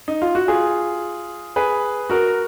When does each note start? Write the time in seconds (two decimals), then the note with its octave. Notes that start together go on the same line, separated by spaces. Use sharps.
0.08 D#4
0.22 F4
0.35 F#4
0.48 F4 G#4
1.56 G#4 B4
2.10 F#4 A#4